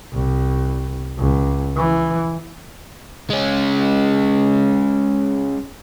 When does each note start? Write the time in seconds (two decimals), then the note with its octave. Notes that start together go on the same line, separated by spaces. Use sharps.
0.13 C2
1.19 C#2
1.77 E3
3.30 G#3 C#4